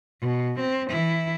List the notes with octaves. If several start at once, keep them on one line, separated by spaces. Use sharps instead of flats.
B2
C4
E3 E4